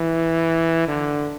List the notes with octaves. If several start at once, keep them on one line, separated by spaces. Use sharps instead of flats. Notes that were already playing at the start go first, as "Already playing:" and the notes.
Already playing: E3
D3